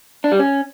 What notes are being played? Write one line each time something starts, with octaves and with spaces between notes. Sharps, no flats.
D4
G3
C#4